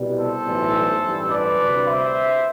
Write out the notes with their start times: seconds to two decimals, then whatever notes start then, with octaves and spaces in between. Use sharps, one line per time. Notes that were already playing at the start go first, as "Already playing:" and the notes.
Already playing: C2 B2 G3
0.16 A4 C5
0.45 B1 A2 E3 G3
1.02 A1 G2 E3 G3
1.30 B4 D5
1.59 D2 C3 G3
1.86 C5 E5